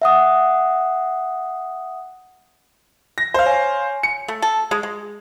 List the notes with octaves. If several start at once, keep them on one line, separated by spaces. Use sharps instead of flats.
E5 F#5 D#6
A#6
C5 F5
C#5 G#5
C#7
A3
A4
G#3
G#3